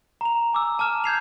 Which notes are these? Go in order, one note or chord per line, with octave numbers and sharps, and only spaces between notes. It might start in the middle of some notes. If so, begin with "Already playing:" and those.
A#5 F7
G#5 D6 E6
A5 D6 F6 E7
G6 G#6 C7 F7